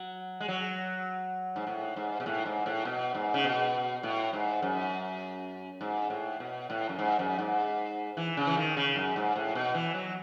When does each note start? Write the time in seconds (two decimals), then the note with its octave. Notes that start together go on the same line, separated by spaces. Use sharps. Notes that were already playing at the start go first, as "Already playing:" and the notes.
Already playing: F#3
0.40 G#3
0.48 F#3
1.56 G#2
1.67 A2
1.96 G#2
2.20 B2
2.26 A2
2.45 G#2
2.66 A2
2.85 B2
3.15 G#2
3.34 C#3
3.44 B2
4.03 A2
4.33 G#2
4.62 F#2
5.81 G#2
6.10 A2
6.40 B2
6.70 A2
6.89 F#2
6.99 G#2
7.19 F#2
7.39 G#2
8.17 E3
8.37 C#3
8.47 E3
8.57 D#3
8.77 C#3
8.96 F#2
9.16 G#2
9.36 A2
9.55 B2
9.74 E3
9.94 F#3